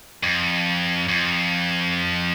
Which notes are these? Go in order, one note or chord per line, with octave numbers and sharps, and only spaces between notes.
F2
F2